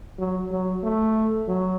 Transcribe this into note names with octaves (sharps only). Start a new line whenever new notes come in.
F#3
F#3
A3
F#3